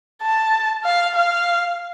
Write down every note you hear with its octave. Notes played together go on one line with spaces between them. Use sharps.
A5
F5
F5